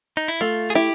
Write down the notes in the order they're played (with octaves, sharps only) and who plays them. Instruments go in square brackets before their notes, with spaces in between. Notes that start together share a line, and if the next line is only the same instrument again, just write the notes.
[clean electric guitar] D#4
E4
[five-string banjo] A3 [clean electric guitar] F4
[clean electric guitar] G#4
[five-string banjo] E4 [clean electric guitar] G4